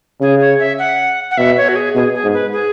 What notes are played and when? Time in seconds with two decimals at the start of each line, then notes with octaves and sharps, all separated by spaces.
0.21 C#3 G#4
0.41 C#5
0.60 E5
0.79 F#5
1.31 F#5
1.38 B2 E5
1.57 C#5
1.69 F#4
1.76 G#4
1.95 B2 G#4
2.14 G#4
2.24 G#2
2.33 B4
2.53 G#4